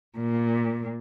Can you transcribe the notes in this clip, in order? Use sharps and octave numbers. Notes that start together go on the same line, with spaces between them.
A#2